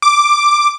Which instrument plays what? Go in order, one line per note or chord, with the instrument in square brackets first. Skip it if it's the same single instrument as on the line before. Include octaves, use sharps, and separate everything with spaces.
[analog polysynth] D6